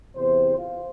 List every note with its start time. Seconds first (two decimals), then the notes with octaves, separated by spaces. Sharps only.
0.16 E2 C3 C5
0.57 F4